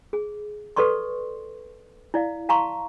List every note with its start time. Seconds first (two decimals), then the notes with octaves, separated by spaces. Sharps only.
0.13 G#4
0.76 A4 B4 D5 C6 C#6
2.14 E4 D5 F5
2.49 F5 A5 A#5 C6 C#6